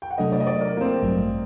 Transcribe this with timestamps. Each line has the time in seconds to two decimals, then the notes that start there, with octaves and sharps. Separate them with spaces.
0.02 G5
0.11 F#5
0.18 C3 F#3 A3 D4 A4 D#5
0.32 D5
0.40 D#5
0.47 D5
0.61 A#4
0.77 A#3
0.81 C4
1.03 A1 G2 F#3 A3